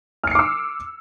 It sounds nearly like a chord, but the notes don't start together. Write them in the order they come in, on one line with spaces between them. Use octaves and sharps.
F6 C#7 C7 D6 E6